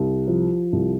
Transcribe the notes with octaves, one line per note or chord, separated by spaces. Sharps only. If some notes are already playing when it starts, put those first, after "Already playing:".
Already playing: C2
F3
C2